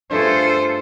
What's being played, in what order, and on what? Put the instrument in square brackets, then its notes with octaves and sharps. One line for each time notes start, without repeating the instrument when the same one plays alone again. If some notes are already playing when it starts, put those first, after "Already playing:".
[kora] G2 A3 G#4 [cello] F4 A4 [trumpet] C5